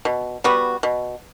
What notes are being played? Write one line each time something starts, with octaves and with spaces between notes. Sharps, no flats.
B2
G3 B3 F#4
B2